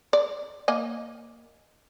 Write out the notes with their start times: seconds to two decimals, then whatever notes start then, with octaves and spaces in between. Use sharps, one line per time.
0.13 D5
0.68 A#3 D#5 G#5